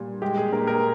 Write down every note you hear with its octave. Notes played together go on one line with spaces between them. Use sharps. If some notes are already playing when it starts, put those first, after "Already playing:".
Already playing: A#2 G3
G#3 G4
G#4
A#2 A#4
A#4